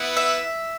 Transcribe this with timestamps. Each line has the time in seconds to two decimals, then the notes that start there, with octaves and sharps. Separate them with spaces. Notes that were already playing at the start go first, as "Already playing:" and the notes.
Already playing: B3 E4 B4 F#5
0.17 E5